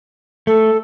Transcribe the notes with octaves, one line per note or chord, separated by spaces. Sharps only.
A3 A4